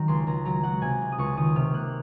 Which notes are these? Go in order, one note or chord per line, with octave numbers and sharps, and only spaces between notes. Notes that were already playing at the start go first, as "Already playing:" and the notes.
Already playing: D#3 F#3 A#5
C#2 C6
C#2 A#5
F#3 A#5
F#3 F#5
C3 G#5
C#2
D#6
C#2 C#6
D#3 D#6
C3 F6
A#3 F#6